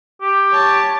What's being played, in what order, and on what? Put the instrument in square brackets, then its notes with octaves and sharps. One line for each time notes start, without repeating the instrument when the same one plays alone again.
[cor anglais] G4
[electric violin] C#5 A5